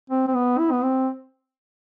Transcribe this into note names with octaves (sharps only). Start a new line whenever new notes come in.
C4
C4
B3
E4
B3
C4